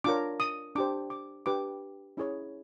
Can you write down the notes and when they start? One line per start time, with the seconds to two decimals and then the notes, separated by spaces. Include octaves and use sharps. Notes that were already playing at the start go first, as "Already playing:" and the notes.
0.04 D4 F4 A#4 C#5 D6
0.40 D#6
0.75 D4 G4 C5 D6
1.10 D6
1.46 D4 G4 B4 D6
2.17 C#4 E4 G#4 C#5